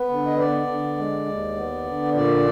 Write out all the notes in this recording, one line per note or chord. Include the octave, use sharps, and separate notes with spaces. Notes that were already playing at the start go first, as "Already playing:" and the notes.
Already playing: B3 B4
D3
D#5
B3 D5
D3
G#3
D#2
B3
D3
A#2 D5